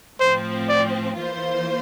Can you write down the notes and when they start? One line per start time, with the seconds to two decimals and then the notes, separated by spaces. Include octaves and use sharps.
0.20 A2 F3 C4 C5
0.69 D5
1.17 E3 A#3 F4 C5